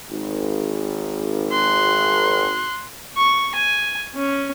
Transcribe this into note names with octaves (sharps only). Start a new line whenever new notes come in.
G#1
C6 F#6
C#6
G#5
C#4